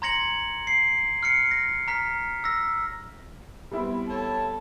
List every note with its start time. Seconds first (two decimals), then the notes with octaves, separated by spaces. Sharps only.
0.02 A#5 C6 G#6 A#6 C#7 F#7
0.67 C7
1.23 F6 C7 C#7
1.51 A#6
1.88 A#5 F6 B6
2.44 E6 A#6
3.71 G3 B3 C4 E4
4.07 A4 C#5 A5